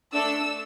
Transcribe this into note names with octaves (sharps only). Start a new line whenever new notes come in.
A3 D4 A4 E6